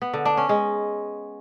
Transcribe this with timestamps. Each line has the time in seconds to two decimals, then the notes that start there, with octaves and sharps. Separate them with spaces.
0.02 B3
0.14 D3
0.25 D4
0.37 C#4
0.49 G#3